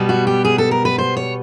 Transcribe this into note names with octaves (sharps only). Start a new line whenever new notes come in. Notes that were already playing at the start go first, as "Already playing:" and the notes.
Already playing: B2 G3 B3
F#4
G4
G#4
A4
A#4
B4
C5
C#5